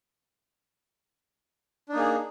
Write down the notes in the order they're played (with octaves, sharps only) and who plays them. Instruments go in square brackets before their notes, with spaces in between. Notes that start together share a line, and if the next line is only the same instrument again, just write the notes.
[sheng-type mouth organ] D4
D#4
A#3
G#4